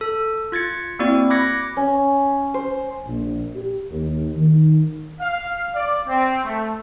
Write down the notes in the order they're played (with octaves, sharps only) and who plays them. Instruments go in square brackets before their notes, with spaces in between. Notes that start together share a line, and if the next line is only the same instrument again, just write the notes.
[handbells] A4
F4 G#6 A6 C#7
A#3 C4 E4 F#4 D5
B5 D6 F#6 G#6 A#6 C#7
[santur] C#4
C5
[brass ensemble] A#1
G4
D#2
D#3
[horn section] F5
D5
C4
A3